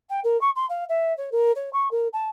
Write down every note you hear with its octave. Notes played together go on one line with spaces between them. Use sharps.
G5
A#4
C#6
C6
F5
E5
C#5
A#4
C#5
C#6
A#4
A5